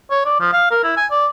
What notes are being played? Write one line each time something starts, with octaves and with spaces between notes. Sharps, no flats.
C#5
D5
F3
F5
A#4
E4
G#5
D5